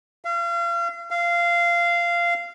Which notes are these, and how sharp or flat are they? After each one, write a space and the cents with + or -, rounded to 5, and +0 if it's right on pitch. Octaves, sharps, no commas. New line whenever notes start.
F5 -35
F5 -15